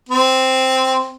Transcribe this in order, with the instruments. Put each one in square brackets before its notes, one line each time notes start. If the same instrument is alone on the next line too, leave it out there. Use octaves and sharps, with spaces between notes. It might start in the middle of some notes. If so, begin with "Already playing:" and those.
[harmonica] C4